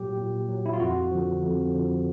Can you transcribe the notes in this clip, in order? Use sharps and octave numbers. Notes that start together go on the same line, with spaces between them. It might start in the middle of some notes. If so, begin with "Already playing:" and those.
Already playing: A#2 F#3 G4
A#2
F#3
E4
F4
F2 F#4
D3 F3
F2
D3 F3